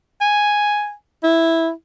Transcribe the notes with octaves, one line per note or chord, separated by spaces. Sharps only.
G#5
E4